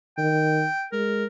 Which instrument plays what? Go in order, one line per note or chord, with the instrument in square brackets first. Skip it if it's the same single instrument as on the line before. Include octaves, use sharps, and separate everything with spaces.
[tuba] D#3 [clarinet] G5
[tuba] G#3 [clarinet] A#4